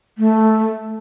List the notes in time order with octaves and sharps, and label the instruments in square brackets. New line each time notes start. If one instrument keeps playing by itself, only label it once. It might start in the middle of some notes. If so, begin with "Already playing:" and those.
[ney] A3